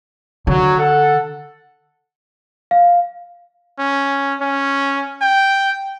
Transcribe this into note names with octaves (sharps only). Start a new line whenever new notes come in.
D3 F#3
A4 F#5
F5
C#4
C#4
G5